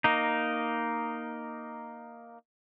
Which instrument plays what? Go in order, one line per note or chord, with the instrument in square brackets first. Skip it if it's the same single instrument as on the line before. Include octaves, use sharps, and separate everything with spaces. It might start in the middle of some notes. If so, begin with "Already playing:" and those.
[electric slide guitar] A#3 D#4